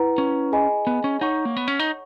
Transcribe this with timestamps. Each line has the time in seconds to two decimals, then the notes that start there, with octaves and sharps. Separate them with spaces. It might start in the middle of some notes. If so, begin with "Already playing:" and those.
Already playing: E4 B4 F#5 A#5
0.18 C#4
0.52 G#4 D#5 G#5 B5
0.87 B3
1.04 C#4
1.21 D#4 C#5 F#5 C#6
1.45 A#3
1.57 B3
1.68 C#4
1.80 D#4